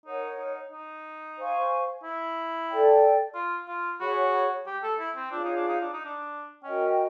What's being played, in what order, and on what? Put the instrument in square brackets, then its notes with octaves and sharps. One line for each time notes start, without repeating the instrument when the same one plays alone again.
[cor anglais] D#4 [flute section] A#4 C#5 F#5
[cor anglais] D#4
D#4
[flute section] C5 F5 G#5 C#6
[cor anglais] E4
[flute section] A4 D5 G5
[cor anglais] F4
F4
[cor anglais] F#4 [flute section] G#4 C#5 F#5 B5
[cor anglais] G4
A4
E4
C4
[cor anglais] D4 [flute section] F4 G#4 C#5 F5
[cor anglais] D#4
D4
D#4
D4
D#4
D4
[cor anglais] C#4 [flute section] F#4 A#4 D#5 G5